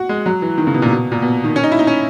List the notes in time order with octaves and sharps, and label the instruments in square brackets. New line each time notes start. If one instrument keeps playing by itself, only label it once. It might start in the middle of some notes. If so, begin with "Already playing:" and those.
Already playing: [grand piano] F#4
G#3
F#3
E3
D#3
C#3
B2
A#2
B2
A#2
B2
D#3
C#4
D#4
E4
D#4
C#4